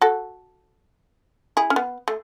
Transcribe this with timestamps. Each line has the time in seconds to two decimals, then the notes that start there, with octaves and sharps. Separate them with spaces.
0.01 F#4 A4
1.57 E4 G#4
1.70 C#4
1.76 B3
2.08 A3